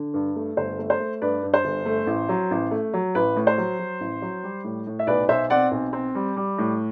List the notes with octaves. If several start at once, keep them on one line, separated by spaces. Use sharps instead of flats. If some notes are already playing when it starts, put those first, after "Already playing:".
Already playing: D3
G2
A3
G1 C5
A3
C5
A3
G2 B4 D5
G2
C5
G1
A3
A1
F#3
A1
A3
F#3
A1 B4
A2
C5
F#3
F#3
A1
F#3
G3
A2
A2
E5
B1 B4 D5
B1 C5 E5
C4 D5 F#5
B1
C4
G3
G3
A2